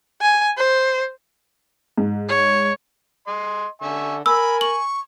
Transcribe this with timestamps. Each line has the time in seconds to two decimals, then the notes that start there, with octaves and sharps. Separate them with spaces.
0.22 G#5
0.58 C5
1.98 G#2
2.29 C#5
3.27 D#5 C6
3.82 D3 E5 G#5 C#6
4.26 A#4 G#5 B5 E6
4.61 C#6 F#7